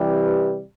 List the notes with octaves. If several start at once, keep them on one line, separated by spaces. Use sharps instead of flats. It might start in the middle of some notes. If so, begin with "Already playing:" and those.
Already playing: C3 E3 G3 G4 B4